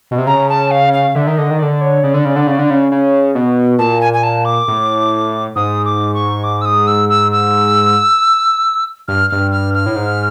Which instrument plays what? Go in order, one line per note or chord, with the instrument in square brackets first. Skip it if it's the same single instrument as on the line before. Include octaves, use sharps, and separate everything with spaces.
[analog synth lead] B2
C3
[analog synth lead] C#3 [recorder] A#5
[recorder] A5
F5
F5
[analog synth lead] D3 [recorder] E5
[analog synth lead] D#3
[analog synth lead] D3 [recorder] D#5
[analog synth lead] D#3
[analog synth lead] D3 [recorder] D5
[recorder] C#5
[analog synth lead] C#3 [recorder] D5
[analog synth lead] D3
C#3
D3
C#3
D3
C#3
C#3
B2
[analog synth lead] A#2 [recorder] A5
[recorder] G#5
G#5
A5
D6
[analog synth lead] A2
[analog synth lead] G#2 [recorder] D#6
[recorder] D6
C#6
D6
E6
D#6
E6
E6
E6
[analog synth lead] G2 [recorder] F6
[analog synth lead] G2 [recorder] F6
[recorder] F6
F6
[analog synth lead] A2
G#2